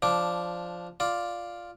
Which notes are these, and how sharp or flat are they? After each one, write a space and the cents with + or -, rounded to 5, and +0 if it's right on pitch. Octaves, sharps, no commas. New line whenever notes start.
F3 +0 D4 +0 D6 +0
F4 +0 D5 +0